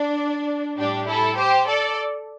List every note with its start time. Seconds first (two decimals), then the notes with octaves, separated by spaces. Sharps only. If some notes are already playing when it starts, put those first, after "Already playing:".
Already playing: D4
0.78 A2 G3 D4 G4
1.08 E4 A4
1.39 G4 C5
1.68 A4 D5